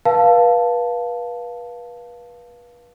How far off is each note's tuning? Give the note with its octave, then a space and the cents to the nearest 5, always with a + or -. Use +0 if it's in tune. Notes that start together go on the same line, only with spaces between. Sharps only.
B4 -30 F5 +0 A5 +0